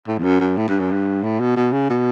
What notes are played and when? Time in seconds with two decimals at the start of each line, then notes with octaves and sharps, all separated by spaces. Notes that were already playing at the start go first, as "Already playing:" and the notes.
0.08 A2
0.18 E2
0.23 F#2
0.40 F#2
0.57 A2
0.69 G2
0.80 F#2
0.91 G2
1.23 A2
1.40 B2
1.56 B2
1.73 C#3
1.90 B2